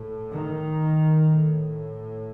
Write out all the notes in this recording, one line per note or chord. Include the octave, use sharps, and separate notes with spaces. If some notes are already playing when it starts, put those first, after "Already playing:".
Already playing: A2
D#3
A2